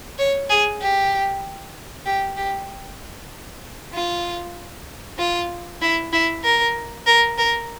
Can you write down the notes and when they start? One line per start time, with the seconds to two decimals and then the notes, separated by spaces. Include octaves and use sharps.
0.19 C#5
0.50 G#4
0.81 G4
2.06 G4
2.37 G4
3.93 F4
5.19 F4
5.82 E4
6.13 E4
6.44 A#4
7.07 A#4
7.38 A#4